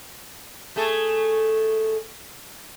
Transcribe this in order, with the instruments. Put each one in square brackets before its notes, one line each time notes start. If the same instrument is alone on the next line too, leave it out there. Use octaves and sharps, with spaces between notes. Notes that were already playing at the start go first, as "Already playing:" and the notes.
[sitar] A3 G#4 A4